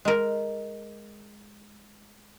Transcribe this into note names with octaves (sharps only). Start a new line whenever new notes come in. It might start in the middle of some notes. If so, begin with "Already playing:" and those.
G#3 A#4